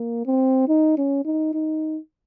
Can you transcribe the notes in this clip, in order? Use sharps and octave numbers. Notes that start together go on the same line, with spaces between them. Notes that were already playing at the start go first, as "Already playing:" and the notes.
Already playing: A#3
C4
D#4
C#4
D#4
D#4